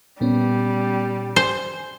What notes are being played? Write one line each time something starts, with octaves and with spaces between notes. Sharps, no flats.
A#2 G3 B3 C#4
C5 G#5